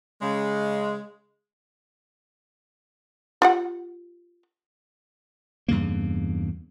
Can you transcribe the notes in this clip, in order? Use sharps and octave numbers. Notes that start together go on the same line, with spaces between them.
C#3 G#3
F4 G4 F#5
E2 G2 C#3 A#3